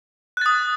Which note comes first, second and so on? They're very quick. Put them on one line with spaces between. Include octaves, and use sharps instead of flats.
F#6 A6 D#6